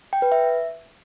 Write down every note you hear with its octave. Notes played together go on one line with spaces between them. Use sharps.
G5
B4
E5